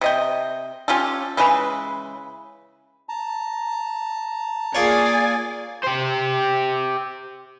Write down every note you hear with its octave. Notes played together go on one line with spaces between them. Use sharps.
C3 D#5 G5
C#4 F4 G4 A4
C#3 E3 G#3 B4
A5 A#5
A#3 F4 G#4 C#5 D5 G#5
G4 C5